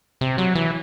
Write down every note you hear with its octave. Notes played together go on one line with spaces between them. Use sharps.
C3
F#3
E3